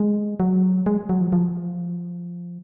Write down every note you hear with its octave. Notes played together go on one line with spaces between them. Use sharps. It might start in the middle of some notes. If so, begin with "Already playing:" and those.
Already playing: G#3
F#3
G#3
F#3
F3
F3